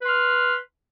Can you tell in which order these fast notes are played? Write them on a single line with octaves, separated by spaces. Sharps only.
B4 C6 F6